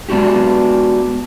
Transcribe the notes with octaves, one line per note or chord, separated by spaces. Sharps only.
G#3 B3 D4 F#4 G4